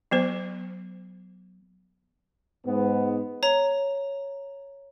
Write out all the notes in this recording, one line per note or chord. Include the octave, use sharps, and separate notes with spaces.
F#3 B3 C5
G#2 B3
C#5 A#5